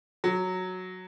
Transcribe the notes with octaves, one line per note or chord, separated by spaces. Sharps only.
F#3